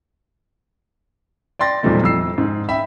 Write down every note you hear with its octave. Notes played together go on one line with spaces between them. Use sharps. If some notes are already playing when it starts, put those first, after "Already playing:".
D5 G5 C6 A6 A#6
E1 A#2 F3 G3 A3 D#4
F2 E4 E6 C7
G#2 D#3
E5 G5 B5